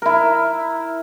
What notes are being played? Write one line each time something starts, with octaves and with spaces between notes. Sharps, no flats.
E4 A#4